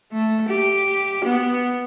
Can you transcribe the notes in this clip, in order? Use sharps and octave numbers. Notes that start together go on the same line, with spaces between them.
A3
G4
B3